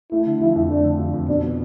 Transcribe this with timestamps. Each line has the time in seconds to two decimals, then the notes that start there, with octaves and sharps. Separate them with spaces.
0.11 A3 E4
0.26 D3
0.40 F3 E4
0.56 F2
0.70 A3 D4
0.84 D3
0.99 F3
1.14 F2
1.28 B2 D4
1.43 B3